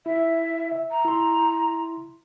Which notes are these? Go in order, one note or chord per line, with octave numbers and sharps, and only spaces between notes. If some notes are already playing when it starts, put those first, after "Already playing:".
E4 E5
E5
A#5
E4 C6